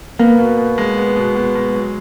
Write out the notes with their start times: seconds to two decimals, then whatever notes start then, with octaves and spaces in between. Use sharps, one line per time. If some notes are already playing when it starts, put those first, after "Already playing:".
0.19 A#3 B3
0.39 B2
0.58 B2
0.78 G#3
0.97 B3
1.16 B2
1.36 B2
1.55 G#3
1.74 F#3